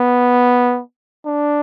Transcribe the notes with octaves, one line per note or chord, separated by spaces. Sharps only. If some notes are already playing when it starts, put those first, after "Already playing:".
Already playing: B3
D4